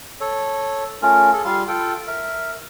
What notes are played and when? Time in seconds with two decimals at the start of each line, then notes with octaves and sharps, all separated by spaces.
0.21 A4 C#5
1.02 A3 C#4 F4 A#4
1.33 G#4 A4
1.45 G3 F4 F5 C6
1.68 F4 A4 G5
2.08 A#4 E5